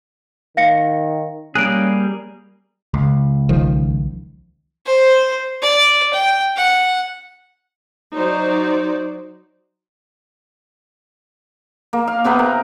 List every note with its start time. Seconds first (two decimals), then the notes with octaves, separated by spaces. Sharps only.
0.57 D#3 F5 A#6 C#7
1.55 G3 A#3 C#4 G#4 F#6 D7
2.94 C#2
3.49 B1 D#3 F3
4.86 C5
5.62 D5
6.13 G5
6.57 F#5
8.15 F#3 D#4 C5 D5
11.93 A#3
12.07 F5
12.24 C3 B3 B4 A#5
12.39 A#4